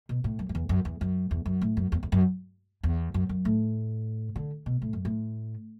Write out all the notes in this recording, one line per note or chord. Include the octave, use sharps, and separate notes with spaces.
B2
A2
F#2
F#2
E2
F#2
E2
F#2
E2
F#2
A2
F#2
E2
E2
F#2
E2
F#2
F#2
A2
D3
B2
A2
F#2
A2